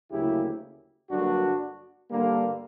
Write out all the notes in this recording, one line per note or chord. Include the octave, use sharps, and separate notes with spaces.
D2 C#3 F#3 A#3 E4 G4
G2 D3 F#3 A#3 D4 F#4
G2 D3 G3 A#3